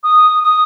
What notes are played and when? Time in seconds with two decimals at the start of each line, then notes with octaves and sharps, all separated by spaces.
0.04 D#6
0.43 D#6